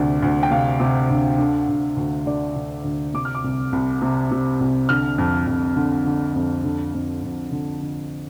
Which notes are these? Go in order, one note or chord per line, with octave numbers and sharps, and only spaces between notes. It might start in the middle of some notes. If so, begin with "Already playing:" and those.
Already playing: D2 C3 D5
D2
G5
C3 F5
C3
D2
D3
D2
D2
D3 D5
D3
D2
C3 D6
F6
D6
C2
C2
C3
C3
C2
D3 F6
F2
F2
D3
D3
F2
D3
F2
F2
D3
D3